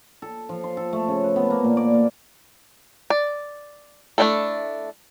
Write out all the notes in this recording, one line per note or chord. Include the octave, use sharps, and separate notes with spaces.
A4
F3
C6
A4
A3
C#3
B4
B3
A#3
A#2
D5
A#3
D5
A3 A#3 D4 E4 A4